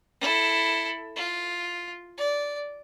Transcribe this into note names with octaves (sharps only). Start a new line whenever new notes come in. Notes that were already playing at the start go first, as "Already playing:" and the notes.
E4 A4
F4
D5